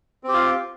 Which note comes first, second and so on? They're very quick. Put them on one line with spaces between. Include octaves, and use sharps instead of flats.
C4 G4 F4